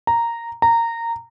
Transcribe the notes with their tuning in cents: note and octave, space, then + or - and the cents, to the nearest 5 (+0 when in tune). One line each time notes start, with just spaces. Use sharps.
A#5 -5
A#5 -15